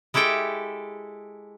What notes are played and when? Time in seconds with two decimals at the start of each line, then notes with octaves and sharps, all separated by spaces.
0.14 G#3 E4 G4 A4 G5